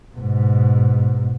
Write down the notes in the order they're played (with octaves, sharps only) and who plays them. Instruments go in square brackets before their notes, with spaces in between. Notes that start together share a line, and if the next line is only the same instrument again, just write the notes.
[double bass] G#2 B2